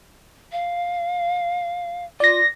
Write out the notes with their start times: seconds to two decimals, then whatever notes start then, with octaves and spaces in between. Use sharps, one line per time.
0.52 F5
2.20 F4 D5 A#6